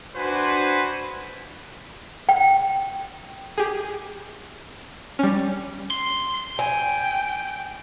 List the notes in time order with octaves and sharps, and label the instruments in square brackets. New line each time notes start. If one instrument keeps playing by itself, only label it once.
[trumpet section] D4 F#4 B4 C5 G#5
[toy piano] G5
[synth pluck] G4 G#4
G3 C#4
[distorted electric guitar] C6
[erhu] G5 [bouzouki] G#5